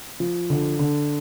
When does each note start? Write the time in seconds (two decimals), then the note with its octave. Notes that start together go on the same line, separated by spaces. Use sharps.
0.20 F3
0.50 D3
0.79 D3